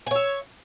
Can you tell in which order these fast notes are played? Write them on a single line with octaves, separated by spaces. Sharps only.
G#5 C#5 E5